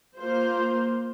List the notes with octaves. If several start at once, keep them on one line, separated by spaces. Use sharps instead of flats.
A#3 F4 C5